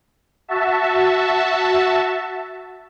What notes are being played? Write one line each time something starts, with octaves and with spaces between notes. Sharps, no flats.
F#4 E5 A5